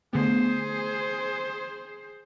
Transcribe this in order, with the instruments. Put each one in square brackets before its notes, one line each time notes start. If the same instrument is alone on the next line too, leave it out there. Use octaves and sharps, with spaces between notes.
[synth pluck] D3 A3 B3 [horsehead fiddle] G#4 C5